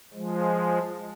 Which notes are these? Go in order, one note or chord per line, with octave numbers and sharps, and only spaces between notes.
F3 G#3